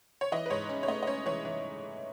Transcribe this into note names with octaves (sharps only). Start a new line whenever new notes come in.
C#5
E3 D#5
B4
G#2 C#5
C#4
C#5
A3 D#5
D#5
C#4 C#5
E3 C#5
E3